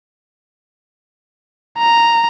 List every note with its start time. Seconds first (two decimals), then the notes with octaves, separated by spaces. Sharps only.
1.79 A#5